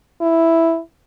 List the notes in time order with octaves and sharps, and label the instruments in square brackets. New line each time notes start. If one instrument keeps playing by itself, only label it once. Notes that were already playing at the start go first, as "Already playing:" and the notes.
[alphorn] E4